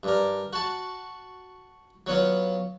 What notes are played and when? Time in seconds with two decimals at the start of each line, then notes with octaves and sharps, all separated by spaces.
0.03 G2 A#4
0.53 F#4 A5
2.07 F#3 B3 F4